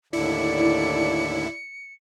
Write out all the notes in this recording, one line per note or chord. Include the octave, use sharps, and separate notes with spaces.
D#2 A2 D3 E4 D5 C#7